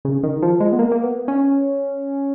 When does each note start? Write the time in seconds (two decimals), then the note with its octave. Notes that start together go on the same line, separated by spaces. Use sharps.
0.05 C#3
0.23 D#3
0.42 F3
0.60 G#3
0.72 B3
0.79 A#3
0.92 A#3
1.03 B3
1.28 C#4